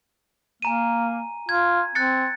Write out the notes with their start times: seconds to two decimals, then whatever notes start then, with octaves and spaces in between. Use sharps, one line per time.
0.62 A#3 G#5 A#5 D#7
1.49 F4 G#6
1.95 C4 F#6 A6 C#7